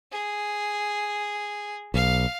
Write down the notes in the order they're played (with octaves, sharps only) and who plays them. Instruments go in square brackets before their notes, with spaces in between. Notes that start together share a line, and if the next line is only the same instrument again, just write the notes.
[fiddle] G#4
[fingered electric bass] B1 [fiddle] F5